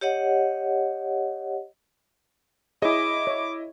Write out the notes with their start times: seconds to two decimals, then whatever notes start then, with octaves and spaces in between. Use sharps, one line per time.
0.01 G4 C#5 D#5 F#5
2.82 E4 G#4 C#5 D#5 D6
3.27 C#5